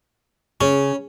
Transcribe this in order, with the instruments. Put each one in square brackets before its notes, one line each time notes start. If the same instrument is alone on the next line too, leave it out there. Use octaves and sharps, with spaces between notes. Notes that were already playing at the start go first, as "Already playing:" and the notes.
[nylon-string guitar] C#3 [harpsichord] C#4